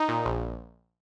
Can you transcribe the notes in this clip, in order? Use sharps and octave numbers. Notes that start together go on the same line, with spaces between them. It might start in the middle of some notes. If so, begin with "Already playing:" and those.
Already playing: D#4
A#2
A#1